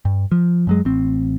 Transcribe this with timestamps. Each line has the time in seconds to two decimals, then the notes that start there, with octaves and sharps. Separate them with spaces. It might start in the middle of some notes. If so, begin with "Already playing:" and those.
0.05 G2
0.32 F3
0.67 F#2 F#3 G#3
0.85 A1 C4